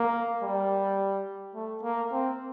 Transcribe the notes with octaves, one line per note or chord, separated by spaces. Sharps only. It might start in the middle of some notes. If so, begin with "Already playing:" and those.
Already playing: A#3
G3
A3
A#3
C4